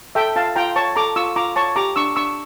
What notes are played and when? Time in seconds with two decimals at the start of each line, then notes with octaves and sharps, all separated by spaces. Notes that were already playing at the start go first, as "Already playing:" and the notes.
0.15 A4 E5 G5
0.36 F4 F5 A5
0.56 F4 G5 A#5
0.76 C#5 A5 C#6
0.96 A4 A#5 D6
1.16 F4 C#6 E6
1.36 F4 A#5 D6
1.56 C#5 A5 C#6
1.76 G4 A#5 D6
1.96 D4 C#6 E6
2.16 D4 C#6 E6